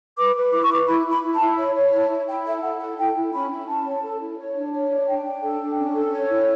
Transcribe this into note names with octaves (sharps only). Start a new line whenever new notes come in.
B4 D6
B4
E4 D6
C#6
B4 D6
E4 B5
E4 B5
E4
A5
E4
C#5 B5
C#5
E4 A5
E4
E4 G5
A4 E5
E4 F#5
A4 F#5
E4 G5
E4
C#4 B5
E4
C#4 A5
C#5
A4
E4
C#5
D4
C#5
D4
D4 G5
D4
A4
D4
C#4
A4
C#5
E4